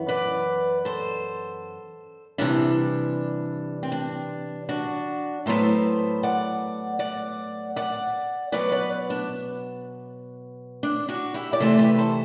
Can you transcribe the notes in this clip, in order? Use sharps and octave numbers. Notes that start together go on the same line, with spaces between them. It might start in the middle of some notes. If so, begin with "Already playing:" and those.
Already playing: F#2 E3 B3
B4 D5
A4 C5
C3 E3 G3 D4
C4
D4
D4 F#4
A2 F#3 B3 A4 C5
D5 F#5
D5 F#5
D5 F#5
B2 F#3 B3 B4 D5
B4 D5
D4
D4
D4 F#4
E4 G4
D5
C3 E3 A3 A4 C5
G4 B4
A4 C5